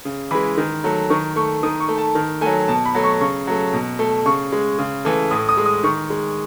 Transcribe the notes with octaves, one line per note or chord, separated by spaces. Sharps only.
C#3
E3 G#3 B5
D#3
F#3 A3
D#3 C#6
A3 C#6
D#3 D#6
C#6
A3
A5
D#3
F#3 A3 G#5
B2 A5
B5
F#3 A3
C#6
C#3 C#6
F#3 A3
B2
A3
C#3 C#6
G#3
C#3
E3 A3
A2 D#6
D#6
G#3
D#6
D#3 C#6
G#3